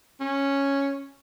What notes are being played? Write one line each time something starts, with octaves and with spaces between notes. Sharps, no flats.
C#4